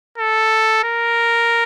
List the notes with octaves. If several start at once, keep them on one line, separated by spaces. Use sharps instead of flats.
A4
A#4